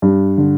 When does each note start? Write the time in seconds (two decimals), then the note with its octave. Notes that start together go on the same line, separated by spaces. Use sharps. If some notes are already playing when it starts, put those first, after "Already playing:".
0.02 G2
0.38 D3